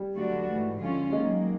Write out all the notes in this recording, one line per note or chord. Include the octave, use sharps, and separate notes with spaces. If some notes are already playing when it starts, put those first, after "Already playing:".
Already playing: G3
D3 F#3 A3 D4 F#4
G#2 E3 A3
D3 F3 G#3 C#4 F4
D#3 F#3 G#3 A#3